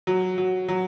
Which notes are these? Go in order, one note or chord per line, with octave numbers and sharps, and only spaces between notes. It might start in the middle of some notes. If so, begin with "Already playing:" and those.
F#3
F#3
F#3